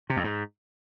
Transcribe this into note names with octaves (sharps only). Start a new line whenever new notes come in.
C3
F2
G#2